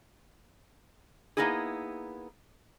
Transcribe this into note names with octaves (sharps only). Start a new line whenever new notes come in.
A#3 B3 D#4 E4 G#4